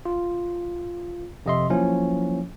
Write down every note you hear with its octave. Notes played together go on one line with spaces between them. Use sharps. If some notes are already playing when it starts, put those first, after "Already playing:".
F4
F2 C3 D#5 E5 C6
F3 F#3 A#3 C#4 E4